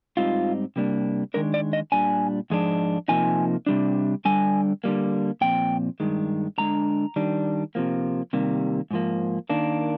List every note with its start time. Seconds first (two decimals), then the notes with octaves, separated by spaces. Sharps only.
0.17 G#2 G3 C4 D#4 F4
0.76 C3 G3 A#3 D4
1.34 D#3 G#3 D4 A#4
1.54 D5
1.73 D#5
1.92 A#2 G3 D4 G#5
2.50 G#2 F3 G#3 D4
3.08 C3 F3 A#3 D#4 G#5
3.67 C3 G3 D4
4.25 D3 G3 D4 G#5
4.84 D3 G3 A#3
5.41 A#2 F3 C4 G5
6.00 G2 D#3 G#3
6.58 D3 G#3 D4 A#5
7.16 D#3 G3 D4
7.75 C3 F3 A#3
8.33 C3 D#3 G3 A#3
8.91 G#2 F3 A#3
9.50 D#3 A#3 D4